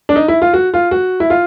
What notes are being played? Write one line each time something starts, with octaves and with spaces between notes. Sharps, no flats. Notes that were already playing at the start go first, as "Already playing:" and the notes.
D4
D#4
E4
F4
F#4
F4
F#4
E4
F4